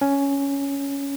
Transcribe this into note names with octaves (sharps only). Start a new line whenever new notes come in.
C#4